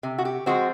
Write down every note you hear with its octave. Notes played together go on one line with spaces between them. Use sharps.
C3
F#4
G4
F3 G#3 C4 F#4